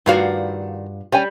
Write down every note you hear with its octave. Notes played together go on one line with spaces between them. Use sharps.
G2 D#3 F4 F#4 D5 F5
G3 C#4 G5 G#5